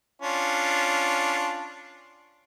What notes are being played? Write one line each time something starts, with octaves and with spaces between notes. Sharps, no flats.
C#4 D4 F4